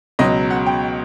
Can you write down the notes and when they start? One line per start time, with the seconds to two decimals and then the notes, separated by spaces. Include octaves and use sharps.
0.19 C#2 B2 F#3 D#5
0.51 F#5
0.66 G5